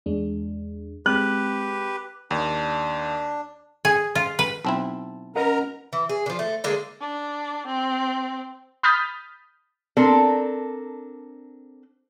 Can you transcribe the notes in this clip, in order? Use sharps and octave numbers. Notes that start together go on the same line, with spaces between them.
E2 G#3 D4
G#3 C4 G4 B4 F#6
D#2 D4
G#4
F4
B4
B1 C4 E4 A5
C#4 A#4 B4 D#5 F#5 A#5
E3
G#4
D3 F3
A3
D3 G#3 A#3
D4
C4
B5 D#6 F6 G6 A6 B6
C4 D4 A4 A#4